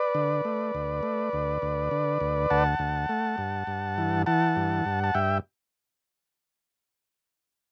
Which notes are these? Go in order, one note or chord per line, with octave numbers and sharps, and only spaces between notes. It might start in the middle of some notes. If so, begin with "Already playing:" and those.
Already playing: B4 D5
D3
A3
D2
A3
D2
D2
D3
D2
D2 F#5 A5
D2
A3
G2
G2
E3
E3 F#5 A5
G2
G2
A5
G2 E5 G5